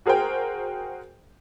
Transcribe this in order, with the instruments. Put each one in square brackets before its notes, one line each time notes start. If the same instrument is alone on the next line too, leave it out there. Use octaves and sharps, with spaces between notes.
[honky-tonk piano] F#4 G#4 A#4 C5 G5